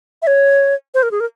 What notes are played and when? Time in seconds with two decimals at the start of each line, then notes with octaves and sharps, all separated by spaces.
0.22 E5
0.27 C#5
0.94 C5
1.03 A#4
1.11 G#4
1.20 A#4